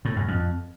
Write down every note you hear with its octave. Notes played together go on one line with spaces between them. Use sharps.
A2
F#2
F2